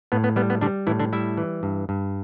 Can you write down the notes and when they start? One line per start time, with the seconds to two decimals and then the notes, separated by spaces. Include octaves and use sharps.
0.12 A2 B3
0.24 B3
0.36 G3 B3
0.50 B3
0.61 D3 G3 D4
0.87 A2 E3 E4
0.99 D3 D4
1.13 G3 E4 E5
1.37 E3
1.63 G2
1.89 G2